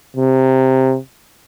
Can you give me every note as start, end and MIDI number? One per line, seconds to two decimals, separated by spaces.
0.16 0.97 48